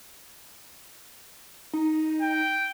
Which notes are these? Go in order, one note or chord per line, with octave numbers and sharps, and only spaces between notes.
D#4
G5